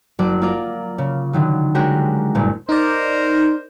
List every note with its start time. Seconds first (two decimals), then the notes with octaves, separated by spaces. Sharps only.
0.19 F#1 F#3 D5
0.41 A#3 F4 A#4 D5
0.98 C#3
1.33 D3 D#3 F#3
1.75 G#3 C#4 D4 F#4 G4 A#4
2.35 F#1 G2 A#2
2.69 D#4 A#4 C5 D5